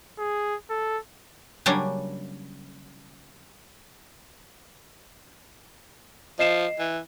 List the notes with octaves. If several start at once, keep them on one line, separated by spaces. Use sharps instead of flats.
G#4
A4
C#3 F#3 G3 A#3 C#4 D4
F3 D#5 C7 E7
E3